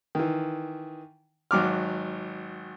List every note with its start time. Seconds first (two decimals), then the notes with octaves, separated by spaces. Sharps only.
0.15 D#3 E3
1.51 G#1 F#3 D6 F6